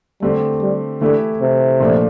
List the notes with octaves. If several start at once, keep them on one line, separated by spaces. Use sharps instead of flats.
D3 G3 A3 C4 G4
G3
D3 E3 A3 E4 G4
C3
A#2 F3 A3 D4